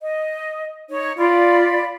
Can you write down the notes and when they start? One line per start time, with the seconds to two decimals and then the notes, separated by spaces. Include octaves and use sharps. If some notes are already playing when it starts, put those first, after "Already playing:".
0.01 D#5
0.89 D#4 C#5
1.18 F4 D5 F5 B5